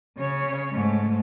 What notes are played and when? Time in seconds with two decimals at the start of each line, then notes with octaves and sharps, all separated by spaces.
0.18 C#3 C#5
0.72 G#2 A3